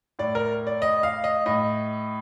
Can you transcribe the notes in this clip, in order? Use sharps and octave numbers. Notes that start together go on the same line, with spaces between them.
A2 D5
A#4
D5
D#5
F5
D#5
A2 D#5